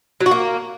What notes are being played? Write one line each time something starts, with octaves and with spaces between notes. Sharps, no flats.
F#3
F#4
A#3